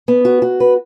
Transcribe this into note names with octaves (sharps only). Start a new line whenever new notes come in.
B3
F#4
F#4
B4